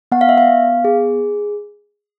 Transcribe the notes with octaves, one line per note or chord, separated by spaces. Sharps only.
B3 F#5
F5
E5
F5
B3
G#4